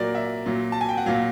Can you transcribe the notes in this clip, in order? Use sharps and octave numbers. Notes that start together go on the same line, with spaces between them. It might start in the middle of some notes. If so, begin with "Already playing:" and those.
Already playing: A#2 F#3 A#4 D5
E5
A#2 F#3
A5
G#5
G5
F#5
A#2 F#3 F5